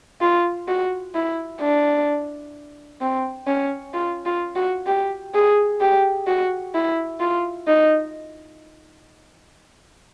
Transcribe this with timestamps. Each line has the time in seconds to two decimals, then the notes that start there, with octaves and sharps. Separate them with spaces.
0.21 F4
0.68 F#4
1.15 E4
1.61 D4
3.01 C4
3.47 C#4
3.94 F4
4.26 F4
4.56 F#4
4.87 G4
5.34 G#4
5.81 G4
6.27 F#4
6.75 E4
7.20 F4
7.67 D#4